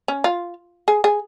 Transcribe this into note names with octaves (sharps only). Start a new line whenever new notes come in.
C#4
F4
G#4
G#4